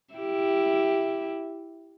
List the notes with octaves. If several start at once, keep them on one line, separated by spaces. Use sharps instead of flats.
E4 G4